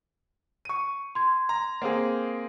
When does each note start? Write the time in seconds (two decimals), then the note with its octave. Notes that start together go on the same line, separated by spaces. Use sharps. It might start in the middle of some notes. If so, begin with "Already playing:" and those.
0.65 C#6 D#7
1.15 C6 G#6
1.49 A#5
1.82 A#3 C4 G#4